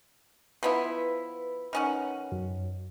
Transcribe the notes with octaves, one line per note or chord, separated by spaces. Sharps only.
F3 B3 E4 B4
D#3 C#4 F#5
F#2